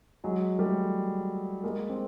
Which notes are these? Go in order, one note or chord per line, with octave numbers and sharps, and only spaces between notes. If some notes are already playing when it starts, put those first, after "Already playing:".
F#3 G#3
G3 A3
G#3 A#3
C4